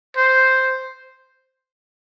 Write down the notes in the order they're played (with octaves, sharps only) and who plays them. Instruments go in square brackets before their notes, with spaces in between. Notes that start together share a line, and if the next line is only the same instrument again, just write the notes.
[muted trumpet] C5